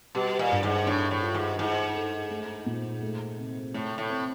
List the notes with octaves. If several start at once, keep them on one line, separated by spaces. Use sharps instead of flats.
B2 G3
A#2
G2
G#2
A2 D4
A2
F4
G#2
G#2 E4
A4
A3
A#2
A3
C3
A2 A3
A2
C4